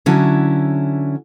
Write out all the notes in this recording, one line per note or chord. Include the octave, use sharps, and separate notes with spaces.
D3 F#3 C#4 E4